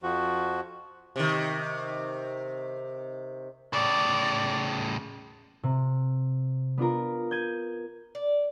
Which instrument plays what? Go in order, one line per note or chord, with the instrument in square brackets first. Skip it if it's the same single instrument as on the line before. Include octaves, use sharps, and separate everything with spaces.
[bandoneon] F2 F3 F#4
[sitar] C3 D#3
[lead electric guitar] A2 C#3 [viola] D5
[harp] C3
B3 D4 F4 A#4
G6 G#6 D#7
[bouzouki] D5